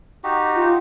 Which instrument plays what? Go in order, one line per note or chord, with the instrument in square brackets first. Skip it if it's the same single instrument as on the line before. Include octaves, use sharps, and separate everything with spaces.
[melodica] D#4 F#4 G4
[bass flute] F4